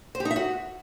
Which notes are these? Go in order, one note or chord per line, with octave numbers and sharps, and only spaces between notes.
C5
G4
D#4
E5
F#4